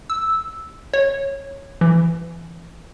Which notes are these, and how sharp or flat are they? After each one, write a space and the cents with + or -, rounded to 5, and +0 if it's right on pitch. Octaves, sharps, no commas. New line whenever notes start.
E6 -5
C#5 -10
E3 +30